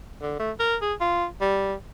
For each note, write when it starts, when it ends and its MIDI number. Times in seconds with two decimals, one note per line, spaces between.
0.22 0.37 50
0.39 0.51 57
0.59 0.76 70
0.82 0.93 68
1.00 1.25 65
1.41 1.73 55